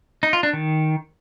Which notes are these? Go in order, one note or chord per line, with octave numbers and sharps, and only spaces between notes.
D#4
F4
D4
D#3